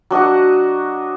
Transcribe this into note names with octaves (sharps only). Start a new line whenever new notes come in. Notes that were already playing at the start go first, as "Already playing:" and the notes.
F#3 D4 D#5 F#5